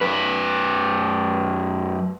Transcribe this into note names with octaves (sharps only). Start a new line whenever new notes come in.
F#2 B4